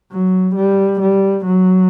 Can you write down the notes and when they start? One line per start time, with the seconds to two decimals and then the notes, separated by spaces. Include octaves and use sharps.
0.12 F#3
0.56 G3
1.01 G3
1.46 F#3